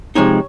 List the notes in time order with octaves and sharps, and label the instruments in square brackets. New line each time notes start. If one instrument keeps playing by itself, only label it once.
[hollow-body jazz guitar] C3 F3 G#3 C4 D#4 C#5